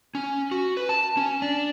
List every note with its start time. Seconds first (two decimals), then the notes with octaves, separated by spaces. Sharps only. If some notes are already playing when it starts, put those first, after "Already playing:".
0.15 C#4
0.51 F#4
0.77 B4
0.89 A5
1.17 C#4
1.42 D4